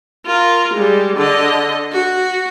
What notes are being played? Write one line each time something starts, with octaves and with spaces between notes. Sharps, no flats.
F4 A#4
G3 G#3
D3 D#5
F#4